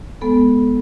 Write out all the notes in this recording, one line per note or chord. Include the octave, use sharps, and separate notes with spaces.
G#3 B3 A4